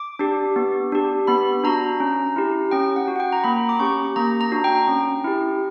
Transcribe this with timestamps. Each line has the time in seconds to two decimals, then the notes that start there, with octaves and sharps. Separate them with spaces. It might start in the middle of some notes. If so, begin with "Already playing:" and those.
Already playing: D6
0.19 D4 G4
0.56 B3
0.92 D4 G4
1.27 B3 B5
1.63 D4 F#4 A#5
2.00 C#4
2.36 E4 G4
2.71 C#4 G5
2.96 F#5
3.08 F#4
3.16 F#5
3.20 G5
3.32 A#5
3.44 A#3 B5
3.69 D6
3.79 C#4 G4 C#6
4.16 A#3 A#5
4.41 A#5
4.52 D4 F#4
4.64 G5
4.88 C#4
5.24 E4 G4